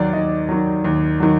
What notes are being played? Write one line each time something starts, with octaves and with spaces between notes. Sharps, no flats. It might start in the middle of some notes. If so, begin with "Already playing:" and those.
Already playing: D#2 D#3 F#3 D5
D#2 D#5
D#3 F#3
D#2
D#3 F#3